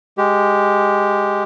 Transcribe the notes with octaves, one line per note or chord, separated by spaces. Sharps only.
G#3 G4